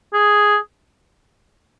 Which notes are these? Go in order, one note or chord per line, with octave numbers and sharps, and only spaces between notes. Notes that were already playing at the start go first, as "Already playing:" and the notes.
G#4